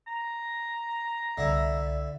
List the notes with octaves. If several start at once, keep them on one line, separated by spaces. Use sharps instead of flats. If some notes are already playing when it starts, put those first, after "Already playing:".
A#5
C2 D3 E4 D5 E5